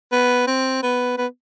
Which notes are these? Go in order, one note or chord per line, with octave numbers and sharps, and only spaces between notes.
B3
C4
B3
B3